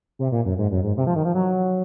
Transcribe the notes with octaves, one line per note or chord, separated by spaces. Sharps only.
C3
A#2
F#2
G#2
F#2
G#2
C3
F3
D#3
F3
F#3